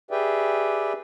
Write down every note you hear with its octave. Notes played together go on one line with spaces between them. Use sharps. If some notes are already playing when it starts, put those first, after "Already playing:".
G4 G#4 B4 D5 E5 G5